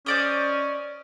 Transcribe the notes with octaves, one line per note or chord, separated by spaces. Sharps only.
C#4 C5 D5 D#5